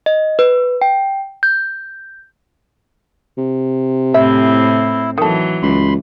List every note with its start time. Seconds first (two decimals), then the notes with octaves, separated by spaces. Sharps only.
0.06 D#5
0.39 B4
0.82 G5
1.43 G6
3.38 C3
4.14 A2 C4 E4 E5
5.18 D#3 E3 F#3 A4
5.63 C#2 B5 C6